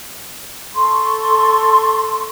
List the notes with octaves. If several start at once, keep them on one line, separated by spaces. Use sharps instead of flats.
A4 C6 C#6